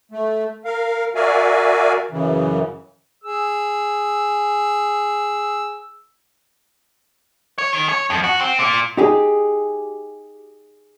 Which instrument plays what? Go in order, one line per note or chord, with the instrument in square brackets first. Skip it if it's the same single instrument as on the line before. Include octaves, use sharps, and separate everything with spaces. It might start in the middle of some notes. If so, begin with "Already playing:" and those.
[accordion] A3
A#4 F5
F#4 A#4 D5 E5 F5 G#5
F#2 C#3 E3
[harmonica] G#4 E6
[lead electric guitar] C#5
D#3
C#5
F2
F#4
C4
A#2
[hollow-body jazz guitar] D#4 G4 G#4